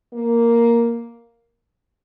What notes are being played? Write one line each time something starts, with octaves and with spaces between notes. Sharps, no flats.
A#3